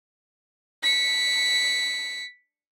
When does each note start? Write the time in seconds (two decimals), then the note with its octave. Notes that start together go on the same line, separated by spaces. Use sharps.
0.83 B6 C#7